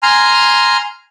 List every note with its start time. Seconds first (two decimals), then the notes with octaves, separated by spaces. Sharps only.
0.03 G#5 A#5 C6 F6